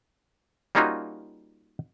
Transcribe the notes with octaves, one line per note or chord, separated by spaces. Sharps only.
G3 A#3 C#4 D#4 F4 F#4